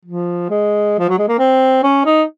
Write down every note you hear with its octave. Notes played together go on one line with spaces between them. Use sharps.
F3
G#3
F3
F#3
G#3
A#3
C4
C#4
D#4